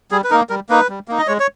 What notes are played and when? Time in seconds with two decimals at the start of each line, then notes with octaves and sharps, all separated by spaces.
0.11 G3 G#4
0.24 B4
0.30 A#3 D#4 A#4
0.49 G3 A#4
0.69 A#3 D#4 B4
0.89 G3
1.08 A#3 D#4
1.19 D#5
1.27 G#3 C#5
1.40 C#5